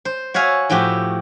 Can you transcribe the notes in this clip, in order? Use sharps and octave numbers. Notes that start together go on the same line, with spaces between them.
C5
F#4 C#5 E5 F5 G#5
A2 F3 F#4 G4 E5